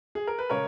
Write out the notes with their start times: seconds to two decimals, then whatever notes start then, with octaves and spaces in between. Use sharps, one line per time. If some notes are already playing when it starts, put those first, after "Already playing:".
0.15 G#4
0.27 A#4
0.39 B4
0.50 C#3 G#3 A#4 C#5